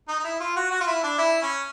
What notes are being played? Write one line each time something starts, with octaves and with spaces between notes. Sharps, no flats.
D#4
D#4
E4
F4
F#4
F#4
F4
E4
D4
E4
C#4